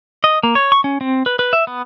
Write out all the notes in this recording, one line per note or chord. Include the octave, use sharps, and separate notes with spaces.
D#5
A#3
C#5
C#6
C#4
C4
B4
B4
E5
B3